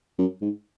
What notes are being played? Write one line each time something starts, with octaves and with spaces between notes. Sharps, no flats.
F#2
G#2